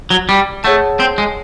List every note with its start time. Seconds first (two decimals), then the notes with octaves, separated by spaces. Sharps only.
0.10 F#3
0.29 G3
0.64 A3 G#4 C#5 F#5 A5
1.00 C4
1.18 G#3